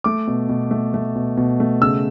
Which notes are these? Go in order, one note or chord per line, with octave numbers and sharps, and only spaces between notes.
A3 D6
B2
B2
A3
A3
B2
B2
A3
C#3 E6